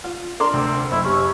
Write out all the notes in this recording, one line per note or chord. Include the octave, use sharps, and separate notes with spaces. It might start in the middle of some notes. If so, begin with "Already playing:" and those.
F4
D4 A#4 C6 D6 F6
D2 C3 C4
F#1 E4
C#4 G4 C#6